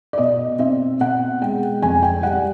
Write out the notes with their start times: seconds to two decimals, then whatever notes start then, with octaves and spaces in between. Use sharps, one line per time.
0.13 D5
0.18 B2 D#5
0.59 C4 E5
1.00 B2 F#5
1.42 G#3 G5
1.82 F2 G#5
2.03 G5
2.23 G3 F#5